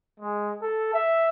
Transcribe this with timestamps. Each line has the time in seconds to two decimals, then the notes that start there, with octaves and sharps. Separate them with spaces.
0.20 G#3
0.62 A4
0.94 E5